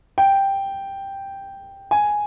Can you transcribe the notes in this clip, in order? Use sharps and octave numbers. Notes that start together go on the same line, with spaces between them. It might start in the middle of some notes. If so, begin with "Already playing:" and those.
G5
G#5